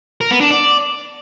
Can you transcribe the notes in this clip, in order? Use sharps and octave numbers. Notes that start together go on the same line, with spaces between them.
A#4
B3
D4
D5